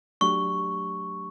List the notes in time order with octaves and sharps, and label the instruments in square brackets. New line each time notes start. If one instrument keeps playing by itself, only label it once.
[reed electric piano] F#3 A3 D4 G4 [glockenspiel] C#6